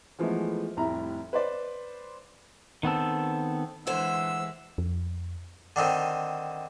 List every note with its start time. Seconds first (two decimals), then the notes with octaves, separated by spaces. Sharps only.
0.19 E3 F3 G#3 A3 B3
0.77 F1 C2 A2 E4 A#5
1.33 B4 C5 D5
2.83 D#3 B3 C4 A4
3.87 A#2 D3 E3 G#3 C5 F#5 E6
4.78 F2
5.76 D3 D#3 C4